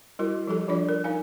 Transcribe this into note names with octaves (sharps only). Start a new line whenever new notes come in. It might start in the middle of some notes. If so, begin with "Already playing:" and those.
G3 E4 F#4 A#4
F3 G3 G4 A4
F3 D4 F4 D5
A#4
D#4 A#4 F5 G#5